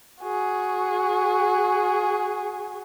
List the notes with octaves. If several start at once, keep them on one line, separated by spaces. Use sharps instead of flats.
F#4 G#4